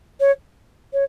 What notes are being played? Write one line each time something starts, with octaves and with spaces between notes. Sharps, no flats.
C#5
C#5